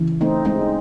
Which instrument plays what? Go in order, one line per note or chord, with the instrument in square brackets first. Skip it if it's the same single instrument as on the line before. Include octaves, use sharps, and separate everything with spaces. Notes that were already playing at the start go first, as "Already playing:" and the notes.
Already playing: [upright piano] C#3 E3
[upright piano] A3 [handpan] C4 D#4
[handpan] G#3 C4
[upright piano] D#4